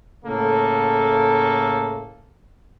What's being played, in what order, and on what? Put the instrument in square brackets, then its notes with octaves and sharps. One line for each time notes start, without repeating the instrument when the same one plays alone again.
[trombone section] A2 C#3 A3 A#3 A4